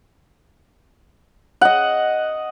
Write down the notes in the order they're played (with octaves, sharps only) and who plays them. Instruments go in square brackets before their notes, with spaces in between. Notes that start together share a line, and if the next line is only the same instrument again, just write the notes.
[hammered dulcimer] D#5 F#5